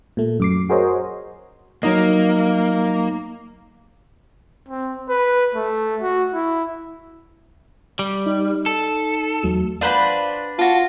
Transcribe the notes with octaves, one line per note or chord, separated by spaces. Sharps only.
A#2 A3
F#2 D6 C7
F#4 G#4 A#4 C5 C#5 D#5
F#3 A#3 D#4 D#5
C4
B4
A3
F#4
E4
G3
D#4
A4
E2 F#3 A3
D4 F4 B4 C5 F#5 B5
F4 F#4 A5